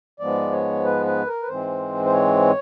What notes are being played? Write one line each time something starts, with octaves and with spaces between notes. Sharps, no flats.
G#2 F3 G#3 B3 D5
C#5
B4
B4
A#4
B4
G#2 E3 G#3 C4 C5
C5
C#5